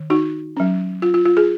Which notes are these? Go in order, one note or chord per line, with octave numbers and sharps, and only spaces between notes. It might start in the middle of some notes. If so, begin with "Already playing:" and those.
Already playing: D#3
D#4 F#4
F#3 C#4
F4
F4
F4
F4 G#4